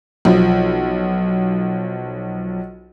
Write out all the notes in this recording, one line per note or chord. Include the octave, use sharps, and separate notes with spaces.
B1 F3